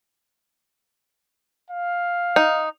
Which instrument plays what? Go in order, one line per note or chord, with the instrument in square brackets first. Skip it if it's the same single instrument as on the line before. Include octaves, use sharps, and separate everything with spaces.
[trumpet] F5
[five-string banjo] D#4